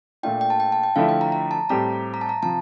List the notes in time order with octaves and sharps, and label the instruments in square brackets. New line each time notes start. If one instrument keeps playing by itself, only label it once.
[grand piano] A#2 A3 D4 F4 [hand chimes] G5
[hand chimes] G5
A5
G5
A5
G5
[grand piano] D3 F3 A3 E4 [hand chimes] F5
[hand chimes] G5
A#5
A#5
A5
[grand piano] A2 G3 C4 G4 [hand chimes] A#5
[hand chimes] A#5
A5
A#5
[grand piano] C3 F3 [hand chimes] A5